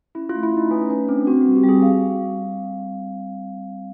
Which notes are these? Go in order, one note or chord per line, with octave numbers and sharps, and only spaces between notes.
C#4 E4
F4
A3
E4
A3 D#4
C#4 B4
C#4 B4
C4 D4
C4 F#4
F#4
G3
G4
G3
G#4
F#4 F5